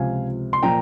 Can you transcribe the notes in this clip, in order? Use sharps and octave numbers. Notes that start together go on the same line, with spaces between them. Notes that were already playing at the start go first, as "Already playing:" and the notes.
Already playing: C#2 C3 F3 F5 G#5
C6
A#2 F3 G5 A#5